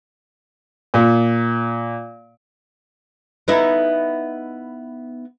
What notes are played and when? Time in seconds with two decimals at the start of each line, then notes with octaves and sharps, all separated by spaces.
0.94 A#2
3.48 B3 D#4 E4